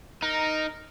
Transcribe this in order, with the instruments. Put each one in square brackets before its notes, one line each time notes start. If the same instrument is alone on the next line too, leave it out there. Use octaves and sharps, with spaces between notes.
[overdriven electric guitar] D#4 [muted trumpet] A#4